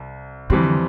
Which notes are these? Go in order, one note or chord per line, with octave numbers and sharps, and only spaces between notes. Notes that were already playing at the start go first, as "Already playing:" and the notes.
Already playing: C2
F2 D3 E3 G3 C4